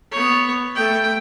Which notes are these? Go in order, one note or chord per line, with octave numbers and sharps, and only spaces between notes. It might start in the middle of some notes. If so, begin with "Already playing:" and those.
B3 C#5
A3 G5